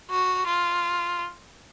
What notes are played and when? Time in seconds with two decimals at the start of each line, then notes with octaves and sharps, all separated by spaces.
0.10 F#4
0.47 F4